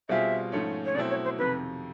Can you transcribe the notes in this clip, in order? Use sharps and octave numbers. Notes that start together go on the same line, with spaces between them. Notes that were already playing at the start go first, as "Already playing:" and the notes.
B2 G3 C4 F4 G#4 E5
G#2 F3 A3 C#4
C#5
B2 F#3 A3 C4 E4 D5
C#5
C5
F2 C3 D#3 B4